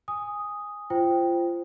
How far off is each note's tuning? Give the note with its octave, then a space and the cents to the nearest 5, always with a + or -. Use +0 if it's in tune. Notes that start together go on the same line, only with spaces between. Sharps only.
G#5 -10 D#6 +0
F4 -25 C5 +0 G5 +0